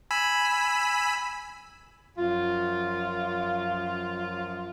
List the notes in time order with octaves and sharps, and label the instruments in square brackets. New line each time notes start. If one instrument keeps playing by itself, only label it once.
[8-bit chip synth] G#5 B5 E6
[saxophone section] F#2 F3 F4